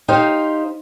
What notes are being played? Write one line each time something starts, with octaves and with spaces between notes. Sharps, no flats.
D#4 G4 C5 F5